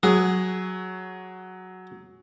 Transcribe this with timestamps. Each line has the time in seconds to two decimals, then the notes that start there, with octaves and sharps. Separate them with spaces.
0.03 F#3 G#4